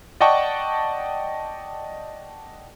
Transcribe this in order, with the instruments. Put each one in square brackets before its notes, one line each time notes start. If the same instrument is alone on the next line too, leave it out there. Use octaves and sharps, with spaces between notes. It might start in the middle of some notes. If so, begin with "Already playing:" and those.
[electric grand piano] D5 D#5 F#5 G5 A5 C#6